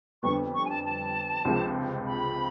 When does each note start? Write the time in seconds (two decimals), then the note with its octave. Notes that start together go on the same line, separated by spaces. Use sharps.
0.23 F2 D3 G3 B3 C#6
0.53 C#6
0.64 G#5
0.69 A5
0.83 A5
1.45 C#2 C3 F3 G#3
2.06 B5